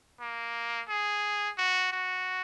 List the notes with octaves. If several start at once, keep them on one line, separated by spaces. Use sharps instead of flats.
A#3
G#4
F#4
F#4